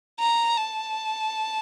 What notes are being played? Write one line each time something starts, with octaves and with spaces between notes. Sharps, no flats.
A#5
A5